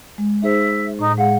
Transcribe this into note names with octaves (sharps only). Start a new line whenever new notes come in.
G#3
D#4 G#4 C5 E5
A2 D#4
G#3 G#4 F5 F#5